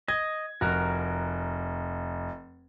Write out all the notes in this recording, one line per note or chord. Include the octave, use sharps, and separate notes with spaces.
D#5 G#6
F1 F#4 A#4